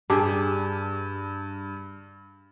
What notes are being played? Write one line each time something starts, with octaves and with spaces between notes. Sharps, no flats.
G2 D4 G4 G#4